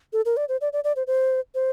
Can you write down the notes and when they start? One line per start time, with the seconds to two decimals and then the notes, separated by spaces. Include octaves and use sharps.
0.13 A4
0.25 A#4
0.37 D5
0.49 C5
0.61 D5
0.73 D5
0.84 D5
0.96 C5
1.07 C5
1.55 C5